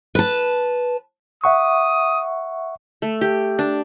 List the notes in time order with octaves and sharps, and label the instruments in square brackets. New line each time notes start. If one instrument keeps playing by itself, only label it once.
[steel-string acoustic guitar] B4 A5
[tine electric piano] E5 F#5 C#6 [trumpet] D#6
[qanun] A3
G4
D4